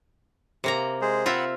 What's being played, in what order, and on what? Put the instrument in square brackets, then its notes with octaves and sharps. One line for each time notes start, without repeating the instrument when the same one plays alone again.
[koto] C3 A#3 A#5
[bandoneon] G#3 G#4 C5
[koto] C4 F4 E5 [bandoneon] F#5 B5